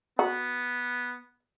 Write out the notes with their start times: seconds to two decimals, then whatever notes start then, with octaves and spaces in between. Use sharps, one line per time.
0.19 B3 F#4